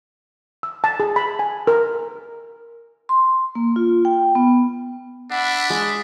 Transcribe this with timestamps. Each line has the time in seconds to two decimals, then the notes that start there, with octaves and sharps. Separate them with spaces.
0.63 E6
0.84 A5
1.00 G#4
1.16 B5
1.39 G#5
1.67 A#4
3.09 C6
3.55 A#3
3.76 F4
4.05 G5
4.35 B3
5.31 D4 E5 F#5 B5
5.70 G#3